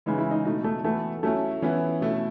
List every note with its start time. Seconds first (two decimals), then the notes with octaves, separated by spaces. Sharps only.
0.06 C#3 E3 G#3 D#4
0.18 E4
0.31 D#4
0.45 B2 A3 D#4 E4
0.64 A3
0.84 E3 A3 B3 F#4
1.23 F#3 A3 C#4 E4
1.62 E3 B3 C#4 E4
2.01 B2 A3 E4